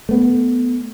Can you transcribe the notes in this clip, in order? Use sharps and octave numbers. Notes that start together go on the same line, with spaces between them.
A3 B3